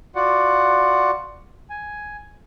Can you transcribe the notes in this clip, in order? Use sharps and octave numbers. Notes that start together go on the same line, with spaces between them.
F4 F#4 D5 F#5
G#5